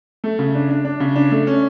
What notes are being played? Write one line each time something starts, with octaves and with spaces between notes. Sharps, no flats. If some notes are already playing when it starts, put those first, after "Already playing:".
A3
C#3
D4
D4
D4
C#3
D4
A3
C#4